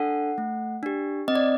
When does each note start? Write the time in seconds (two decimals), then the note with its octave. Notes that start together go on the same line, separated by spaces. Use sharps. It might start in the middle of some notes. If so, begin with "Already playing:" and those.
Already playing: D4 A4 F#5
0.38 A3
0.83 D4 G4
1.28 C4 D#5
1.35 D5